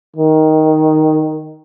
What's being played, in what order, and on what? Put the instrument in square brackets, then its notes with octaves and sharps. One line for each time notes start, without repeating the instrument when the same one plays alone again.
[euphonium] D#3